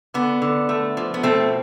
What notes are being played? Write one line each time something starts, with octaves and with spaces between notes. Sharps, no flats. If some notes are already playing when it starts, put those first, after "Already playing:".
D3 B3
D3
A3
F3
B3
B2 A3 C4